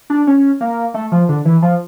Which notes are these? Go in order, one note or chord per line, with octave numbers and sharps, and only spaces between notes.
D4
C#4
A#3
A3
F3
D3
E3
F3